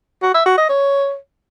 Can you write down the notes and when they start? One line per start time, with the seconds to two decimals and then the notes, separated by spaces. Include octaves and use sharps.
0.23 F#4
0.34 E5
0.46 F#4
0.57 D#5
0.69 C#5